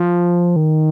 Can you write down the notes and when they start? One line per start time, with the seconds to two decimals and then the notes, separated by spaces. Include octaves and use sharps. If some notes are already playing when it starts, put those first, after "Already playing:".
Already playing: F3
0.56 D#3